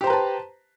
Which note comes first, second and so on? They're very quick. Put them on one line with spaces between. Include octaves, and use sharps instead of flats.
G4 C5 A#5 B4 A5